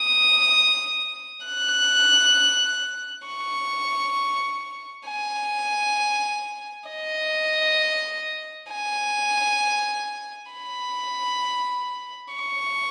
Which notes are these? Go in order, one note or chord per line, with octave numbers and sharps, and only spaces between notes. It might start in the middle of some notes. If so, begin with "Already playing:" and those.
Already playing: D#6
F#6
C#6
G#5
D#5
G#5
B5
C#6